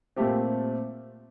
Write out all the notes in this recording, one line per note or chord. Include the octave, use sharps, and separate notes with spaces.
A#2 A3 C4 G4